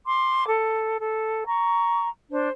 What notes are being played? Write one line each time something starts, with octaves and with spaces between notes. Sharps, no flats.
C6 D6
A4
A4
A#5 C#6
D4 C5